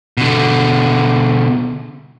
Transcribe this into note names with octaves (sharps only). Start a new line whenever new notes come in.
B2 D3